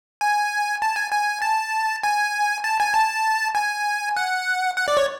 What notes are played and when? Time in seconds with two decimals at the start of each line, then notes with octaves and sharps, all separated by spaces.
0.21 G#5
0.82 A5
0.96 G#5
1.12 G#5
1.42 A5
2.03 G#5
2.64 A5
2.80 G#5
2.94 A5
3.55 G#5
4.17 F#5
4.77 F#5
4.88 D5
4.97 C#5